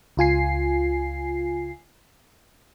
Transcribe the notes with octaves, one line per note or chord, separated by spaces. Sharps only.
C#2 F4 G#5 C7